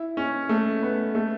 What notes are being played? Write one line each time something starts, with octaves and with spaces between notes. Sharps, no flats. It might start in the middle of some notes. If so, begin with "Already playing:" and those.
Already playing: E4
C#4
A3
B3
A3